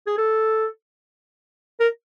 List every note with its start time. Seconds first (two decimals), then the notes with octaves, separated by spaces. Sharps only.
0.07 G#4
0.18 A4
1.80 A#4